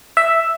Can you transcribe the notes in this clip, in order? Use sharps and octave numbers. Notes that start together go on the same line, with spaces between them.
E5